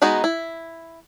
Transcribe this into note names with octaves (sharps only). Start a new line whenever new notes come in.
G#3 B3 D#4 F#4 G#4
E4